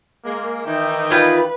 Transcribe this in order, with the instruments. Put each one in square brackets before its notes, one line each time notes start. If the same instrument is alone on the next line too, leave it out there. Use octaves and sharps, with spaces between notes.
[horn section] G#3 A#3
[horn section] D#3 E3 D#4 [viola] E5 G5
[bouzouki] E4 F4 G5 [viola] B4